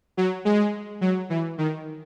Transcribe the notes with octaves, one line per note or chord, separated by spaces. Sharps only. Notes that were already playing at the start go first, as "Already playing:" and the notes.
F#3
G#3
F#3
E3
D#3